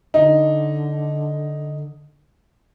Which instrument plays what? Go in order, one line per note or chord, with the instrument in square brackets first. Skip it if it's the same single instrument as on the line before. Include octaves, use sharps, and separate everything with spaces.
[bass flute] D3 [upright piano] D#4